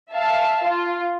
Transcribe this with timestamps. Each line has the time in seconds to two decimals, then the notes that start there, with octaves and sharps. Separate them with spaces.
0.13 E5 F5 A5
0.66 F4